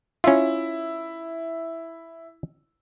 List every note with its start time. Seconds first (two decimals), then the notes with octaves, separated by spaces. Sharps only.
0.24 C#4 E4 F4